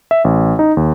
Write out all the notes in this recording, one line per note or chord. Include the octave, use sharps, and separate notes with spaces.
E5
A1
D#4
D#2